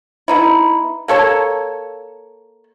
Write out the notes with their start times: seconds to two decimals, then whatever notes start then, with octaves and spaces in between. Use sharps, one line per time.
0.28 B3 D#4 E4
1.08 A#3 A4 C#5 A5